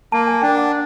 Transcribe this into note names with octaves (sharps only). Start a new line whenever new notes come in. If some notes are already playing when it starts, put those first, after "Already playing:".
A#3 A5
G#5
D4 G5
F#5